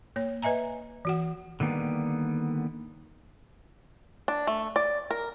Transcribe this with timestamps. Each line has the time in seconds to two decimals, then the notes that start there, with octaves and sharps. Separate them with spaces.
0.16 A#3 C#5
0.42 B4 D#5 E5 G#5 A#5
1.05 E3 F#4 F#5
1.60 D3 D#3 G3 A#3 B3
4.28 D4
4.47 A3
4.76 D5
5.11 A#4